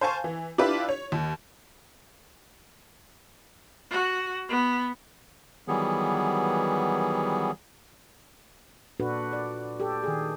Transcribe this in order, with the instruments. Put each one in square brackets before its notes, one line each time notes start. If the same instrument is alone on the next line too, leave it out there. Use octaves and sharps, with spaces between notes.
[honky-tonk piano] C5 F5 G#5 A5 C#6
E3
D4 E4 F4 G4 B4
C#5
D#2
[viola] F#4
B3
[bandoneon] D#3 E3 F#3 G3 B3 G#4
[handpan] A#2 D4 F#4 A4 B4
D5
G4 A4
D#3 G#4